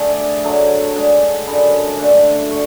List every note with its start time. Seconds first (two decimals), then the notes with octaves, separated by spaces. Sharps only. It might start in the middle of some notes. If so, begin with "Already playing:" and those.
Already playing: D3 A3 G#4
0.09 D5
0.44 D3 F#3 A3
0.95 D3 G#3 D4
1.47 F#2 D3 G#3 B5
1.99 D3 A3 D4
2.51 D3 C#6